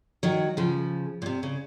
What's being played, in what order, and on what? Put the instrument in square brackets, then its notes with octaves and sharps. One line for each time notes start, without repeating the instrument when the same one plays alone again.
[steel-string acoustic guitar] D#3 F#3
C#3 F3
A#2
C3
C#3